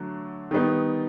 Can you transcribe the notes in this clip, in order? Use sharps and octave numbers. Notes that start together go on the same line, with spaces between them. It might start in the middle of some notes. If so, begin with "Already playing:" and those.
Already playing: D3 F#3 A3
D#3 G3 B3 D#4